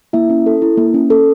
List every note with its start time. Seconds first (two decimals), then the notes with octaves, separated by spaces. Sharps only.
0.13 A#3 E4 E5
0.30 C#4
0.46 A4
0.62 E4
0.78 A#3
0.94 C#4
1.10 A4